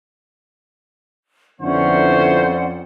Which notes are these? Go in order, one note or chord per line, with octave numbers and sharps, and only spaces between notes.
F2 D3 B3 C#4 E4 C5 D5 F#5